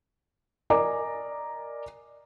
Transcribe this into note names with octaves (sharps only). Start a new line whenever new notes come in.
A#4 D5 D#5 G#5 A#5 D6